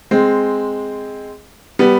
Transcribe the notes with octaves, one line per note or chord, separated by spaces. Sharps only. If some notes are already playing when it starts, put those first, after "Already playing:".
G#3 C4
G3 B3